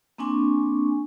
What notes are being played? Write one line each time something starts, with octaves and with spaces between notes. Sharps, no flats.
A#3 C4 D4 G#5 C#6